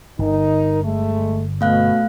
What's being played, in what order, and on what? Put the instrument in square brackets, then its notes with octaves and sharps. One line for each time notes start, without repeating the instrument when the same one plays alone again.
[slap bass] G1 D3 [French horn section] D#4 A#4
[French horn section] G#3 A3
[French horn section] B2 [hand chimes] A3 F5 F#6